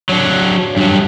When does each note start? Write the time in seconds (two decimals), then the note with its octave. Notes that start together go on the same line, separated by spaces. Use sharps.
0.09 F#3 D4
0.77 G2 F#3